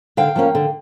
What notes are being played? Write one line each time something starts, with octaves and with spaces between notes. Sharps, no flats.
D3 F5 G5
F3 A#3 C#4
D3